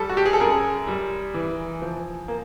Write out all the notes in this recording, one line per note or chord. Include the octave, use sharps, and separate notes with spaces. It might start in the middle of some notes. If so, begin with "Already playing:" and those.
Already playing: G3 A4
F#4
G4
G#4
A4
F#2 G#4 A#4
G3
E3
F3
A#3